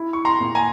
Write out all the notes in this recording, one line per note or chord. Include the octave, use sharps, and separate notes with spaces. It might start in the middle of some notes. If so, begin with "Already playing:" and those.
Already playing: E4
C#6
A#5 C6
A#2
G#5 A#5